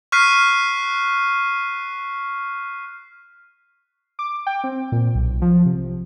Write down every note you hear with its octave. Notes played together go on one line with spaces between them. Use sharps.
C#6 F6 F#6 B6 C7 D#7
D6
G5
C4
A#2
B1
F3
C3